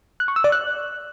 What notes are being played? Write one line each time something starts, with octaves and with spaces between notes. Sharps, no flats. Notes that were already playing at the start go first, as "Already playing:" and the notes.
F#6
C#6
E6
D5
F#6